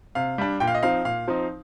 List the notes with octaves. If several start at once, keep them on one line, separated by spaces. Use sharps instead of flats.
C3 F5
G3 D4
A#2 G5
F5
D#5
F3 C4 D#4 F5
A#2 F5
F3 C4 D#4